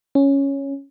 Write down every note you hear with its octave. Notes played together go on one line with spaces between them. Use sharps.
C#4